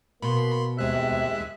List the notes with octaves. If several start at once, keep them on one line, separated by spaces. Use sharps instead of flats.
B2 A#3 B5 C6
D#2 C3 G#3 E5 F#6